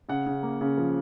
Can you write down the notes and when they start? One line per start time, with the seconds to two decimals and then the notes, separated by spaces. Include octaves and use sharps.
0.09 C#3 F#5
0.26 C#3
0.43 A#3
0.61 C#3
0.78 F3